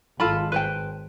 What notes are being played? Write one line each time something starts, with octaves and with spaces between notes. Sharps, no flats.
G#1 F4 A4 B5
B4 C5 G5